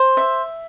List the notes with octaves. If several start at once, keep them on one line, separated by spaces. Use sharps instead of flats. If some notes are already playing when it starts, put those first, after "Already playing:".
Already playing: C5
E5